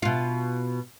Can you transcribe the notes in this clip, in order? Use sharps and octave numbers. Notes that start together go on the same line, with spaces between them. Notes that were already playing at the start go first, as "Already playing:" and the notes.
B2 F4